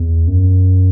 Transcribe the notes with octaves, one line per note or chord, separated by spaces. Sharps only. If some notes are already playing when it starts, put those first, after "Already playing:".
Already playing: E2
F#2